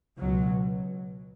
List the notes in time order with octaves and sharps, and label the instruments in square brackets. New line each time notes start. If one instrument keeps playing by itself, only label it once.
[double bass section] C#2 B2 F#3